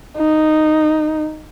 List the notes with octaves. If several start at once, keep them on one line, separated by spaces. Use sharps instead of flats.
D#4